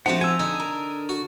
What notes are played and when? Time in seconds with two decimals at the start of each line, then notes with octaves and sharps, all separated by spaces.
0.06 F3 A3 C4 D4 F#4 F#5 A5
0.21 G#5 A#5 E6
0.39 D3 D#4
0.60 A#4
1.09 F#4